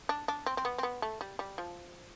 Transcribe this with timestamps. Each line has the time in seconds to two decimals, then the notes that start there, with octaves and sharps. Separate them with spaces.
0.09 D4
0.28 D4
0.46 C4
0.57 C4
0.65 B3
0.78 C4
0.83 B3
1.02 A3
1.21 G3
1.39 G3
1.58 F3